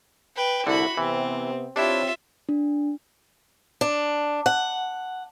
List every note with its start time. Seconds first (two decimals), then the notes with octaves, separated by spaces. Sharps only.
0.36 B4 G5
0.67 C2 D3 E4 F#4 B5
0.97 C3 E3 B3 C4
1.76 C4 D4 E4 F4 G4 C#5 E5
2.49 D4
3.81 D4
4.46 F#5